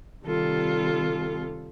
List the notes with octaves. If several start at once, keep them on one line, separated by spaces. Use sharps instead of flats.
C3 D#3 G3 F4 A4